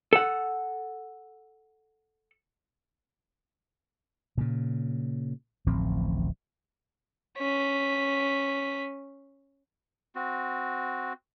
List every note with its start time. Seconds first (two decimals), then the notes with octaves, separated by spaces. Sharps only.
0.13 A4 F#5
4.38 A#2 C#3
5.66 D1 A1 F3 C4
7.38 C#4 B6
10.15 C4 F#4